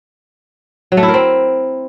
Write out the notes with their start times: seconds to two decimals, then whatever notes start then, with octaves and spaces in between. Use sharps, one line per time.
0.92 F#3
0.97 A3
1.03 E4
1.08 A#4
1.14 C4